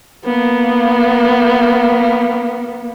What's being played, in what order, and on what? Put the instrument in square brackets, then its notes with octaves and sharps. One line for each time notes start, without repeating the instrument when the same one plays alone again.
[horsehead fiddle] A#3 B3